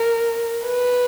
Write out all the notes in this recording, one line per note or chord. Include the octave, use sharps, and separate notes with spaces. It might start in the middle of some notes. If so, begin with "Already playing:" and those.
Already playing: A#4
B4